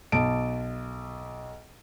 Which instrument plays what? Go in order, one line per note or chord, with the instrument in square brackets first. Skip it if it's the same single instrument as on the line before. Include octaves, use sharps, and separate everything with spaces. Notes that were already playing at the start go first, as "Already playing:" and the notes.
[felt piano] B1 A5 D7